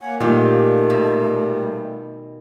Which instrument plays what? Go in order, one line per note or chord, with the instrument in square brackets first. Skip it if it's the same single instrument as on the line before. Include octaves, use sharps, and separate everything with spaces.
[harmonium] A#3 C#5 F#5 [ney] G#5
[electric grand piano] A#2 [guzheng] D#3 F4 G4 [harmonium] G3 [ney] A3
[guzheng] B2